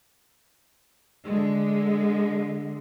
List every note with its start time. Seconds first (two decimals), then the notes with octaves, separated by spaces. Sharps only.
1.26 D3 G#3